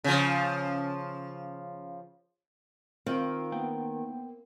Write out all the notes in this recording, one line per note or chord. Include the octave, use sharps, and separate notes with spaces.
C#3 F3
D#3 C4 F4 F5
A#3 B3 G5